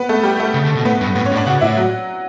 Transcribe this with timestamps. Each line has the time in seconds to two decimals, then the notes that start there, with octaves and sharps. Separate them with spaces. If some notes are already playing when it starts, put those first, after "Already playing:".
Already playing: B3 B4
0.09 A3 A4
0.23 G3 G4
0.40 A3 A4
0.54 C#3
0.65 D3
0.75 B2
0.85 A2 B3 B4
1.01 G2
1.15 A2 B3 B4
1.25 C#4 C#5
1.32 A2
1.36 D4 D5
1.46 C#3 F#4 F#5
1.61 A2 E4 E5
1.77 F#3 F#4